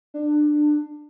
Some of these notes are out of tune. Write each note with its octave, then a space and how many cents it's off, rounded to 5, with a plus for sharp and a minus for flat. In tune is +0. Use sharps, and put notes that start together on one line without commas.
D4 +20